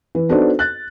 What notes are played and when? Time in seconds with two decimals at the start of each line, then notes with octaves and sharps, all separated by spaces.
0.15 E3
0.29 B3 D4 D#4 F#4 A4 C5
0.59 F#6 A6